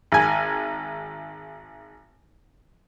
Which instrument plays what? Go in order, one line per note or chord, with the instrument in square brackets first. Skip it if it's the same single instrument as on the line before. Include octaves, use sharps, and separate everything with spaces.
[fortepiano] G#1 G#5